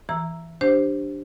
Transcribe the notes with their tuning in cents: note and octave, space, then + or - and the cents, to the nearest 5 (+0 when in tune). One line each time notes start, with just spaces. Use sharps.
E3 +10 A#5 +0 E6 +0
D4 +0 G4 +0 C5 +5